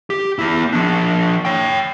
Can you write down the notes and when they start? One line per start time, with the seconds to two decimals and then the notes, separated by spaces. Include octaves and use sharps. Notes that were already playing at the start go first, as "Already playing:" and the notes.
0.10 G4
0.39 B3 E4
0.73 F3 D4
1.45 C#5 G5